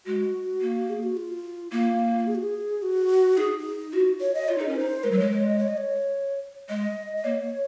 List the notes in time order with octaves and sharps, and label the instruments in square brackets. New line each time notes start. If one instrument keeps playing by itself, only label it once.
[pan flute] G#3 [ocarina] F#4
[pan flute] A#3
[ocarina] G#4
F#4
F4
[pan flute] A#3 [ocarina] F4
[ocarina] G#4
F#4
G#4
F#4
[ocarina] D#4 [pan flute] G#4
[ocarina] D#4
[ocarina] F4 [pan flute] F#4
[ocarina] C#5
D#5
[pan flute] F4 [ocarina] C#5
[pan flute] D#4 [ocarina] G#4
[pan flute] C#4 [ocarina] A#4
[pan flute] D#4 [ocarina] C5
[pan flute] G#3 [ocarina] A#4
[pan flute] F#3
[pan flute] G#3 [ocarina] C#5
[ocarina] C#5
D#5
C#5
D#5
C#5
[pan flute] G#3 [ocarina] D#5
[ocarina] D#5
[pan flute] A#3 [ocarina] C#5